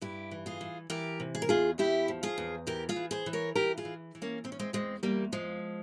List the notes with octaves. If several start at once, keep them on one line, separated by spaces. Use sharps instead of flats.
G2 E4 G4
E3
F4 G#4
E3
E3 G4 A#4
C3
G#4
A#4
E2 F4 G#4
E2 E4 G4
F3
F4 G#4
E2
E3 G4 A#4
F4 G#4
E3
G#4 C5
E3
A#4 C#5
E3 G4 A#4
F4 G#4
E3
E3
A#3 C#4
E2 C4
C#4
G#3 C4
E2 G#3 C4
E2 G3 A#3
F2 F3 G#3